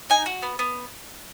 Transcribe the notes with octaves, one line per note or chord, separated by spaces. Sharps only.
D#4 G#5
F#4
B3
B3